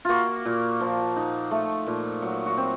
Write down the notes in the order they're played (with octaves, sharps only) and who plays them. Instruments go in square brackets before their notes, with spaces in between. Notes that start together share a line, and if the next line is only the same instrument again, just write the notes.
[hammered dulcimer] A#3 F4 F#4
A#2
F3
D#4
A3
A#2
F#3
F#4
C4